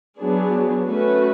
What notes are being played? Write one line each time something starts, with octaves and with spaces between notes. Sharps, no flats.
F#3 B3 D4 G#4
A3 C#4 F#4 B4